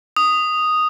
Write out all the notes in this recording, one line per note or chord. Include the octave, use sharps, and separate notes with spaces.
D#6